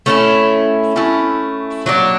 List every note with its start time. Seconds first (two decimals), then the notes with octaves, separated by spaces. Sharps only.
0.06 A3 C#4 E4
0.96 A3 C#4 E4
1.86 F#3 A#3 D4